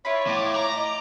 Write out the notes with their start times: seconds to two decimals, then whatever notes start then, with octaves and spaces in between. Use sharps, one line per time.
0.05 E4 F4 C#5 B5
0.27 A2 D6
0.56 A#5
0.75 D#5